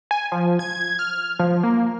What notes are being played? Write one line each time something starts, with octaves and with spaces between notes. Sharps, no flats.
G#5
F3
G#6
F6
F3
A#3